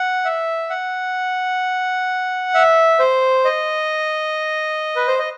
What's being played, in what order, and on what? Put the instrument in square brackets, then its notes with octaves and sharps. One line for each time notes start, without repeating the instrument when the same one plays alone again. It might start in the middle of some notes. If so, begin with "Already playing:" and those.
Already playing: [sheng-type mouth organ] F#5
E5
F#5
E5
C5
D#5
B4
C5
D#5